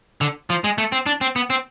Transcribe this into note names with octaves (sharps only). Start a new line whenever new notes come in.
D3
F3
G#3
A3
C4
D4
C4
B3
C4